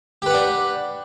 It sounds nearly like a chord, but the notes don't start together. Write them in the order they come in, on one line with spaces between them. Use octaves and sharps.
G4 B4 F#5 D4